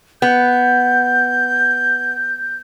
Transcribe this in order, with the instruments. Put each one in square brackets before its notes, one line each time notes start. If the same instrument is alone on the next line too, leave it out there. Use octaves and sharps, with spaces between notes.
[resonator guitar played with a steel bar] B3 [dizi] G6